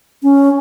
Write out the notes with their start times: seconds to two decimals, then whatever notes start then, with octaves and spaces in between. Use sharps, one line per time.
0.23 C#4